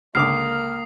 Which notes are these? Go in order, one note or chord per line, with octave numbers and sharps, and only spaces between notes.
C#2 D3 A#3 D6 D#6 F6 C7